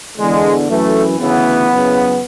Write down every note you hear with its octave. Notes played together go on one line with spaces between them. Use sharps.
E2 D3 G#3
F#2 E3 A3
D2 C#3 E3 B3
F#2 C#3 E3